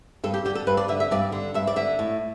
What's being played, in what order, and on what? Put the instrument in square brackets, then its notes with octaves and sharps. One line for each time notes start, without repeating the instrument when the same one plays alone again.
[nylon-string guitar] G2 A4
G4
D3 G4
A4
G2 B4
D5
D3 E5
E5
G2 D5
D3
G2 E5
D5
D3 E5
A2